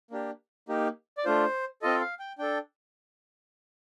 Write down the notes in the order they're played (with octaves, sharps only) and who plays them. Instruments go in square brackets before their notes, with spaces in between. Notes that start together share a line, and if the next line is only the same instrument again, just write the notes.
[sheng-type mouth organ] A#3 D4 G4
A#3 D#4 G4
D5
A3 D4 F4 C5
C4 F4 A4 D#5
F5
G5
D4 A4 G5